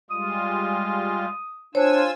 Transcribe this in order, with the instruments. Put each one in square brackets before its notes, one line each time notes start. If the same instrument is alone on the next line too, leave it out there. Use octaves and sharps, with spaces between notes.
[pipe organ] G3 G#3 F4 [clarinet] D#6
[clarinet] D4 [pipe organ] F4 G#5 E6 [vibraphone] C5 C#5